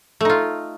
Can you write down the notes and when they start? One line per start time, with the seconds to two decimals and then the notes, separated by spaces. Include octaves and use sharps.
0.21 A3
0.25 D#4
0.30 F4